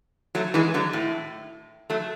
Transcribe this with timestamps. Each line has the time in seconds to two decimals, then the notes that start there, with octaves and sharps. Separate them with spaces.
0.35 F#3 A3
0.54 E3 G#3
0.74 D3 F#3
0.93 A2
1.90 F#3 A3